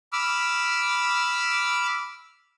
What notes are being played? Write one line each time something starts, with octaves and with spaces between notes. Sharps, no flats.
B5 D6 E6 F6